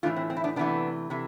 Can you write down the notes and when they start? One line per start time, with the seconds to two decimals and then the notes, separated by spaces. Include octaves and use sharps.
0.03 A2 E3 A3 D4 F4
0.16 C4
0.30 C4
0.37 E4
0.44 B3 D4
0.56 C3 E3 A3 B3 D4
1.10 C3 E3